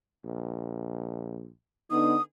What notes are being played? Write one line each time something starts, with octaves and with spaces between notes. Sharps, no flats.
A#1
D3 B3 D#4 D#6